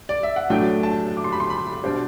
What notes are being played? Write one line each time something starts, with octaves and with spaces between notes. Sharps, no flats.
D5
E5
F#5
A2 F#3 A3 D4 G5
A5
D6
C6
B5
C6
B5
B2 G3 D4 C5